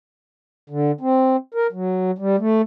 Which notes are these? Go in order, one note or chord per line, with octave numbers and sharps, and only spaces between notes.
D3
C4
A#4
F#3
G3
A3